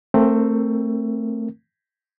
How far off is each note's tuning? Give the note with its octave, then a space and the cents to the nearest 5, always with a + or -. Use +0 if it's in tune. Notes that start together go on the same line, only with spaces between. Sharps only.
A3 +20 C4 +20 A#4 +0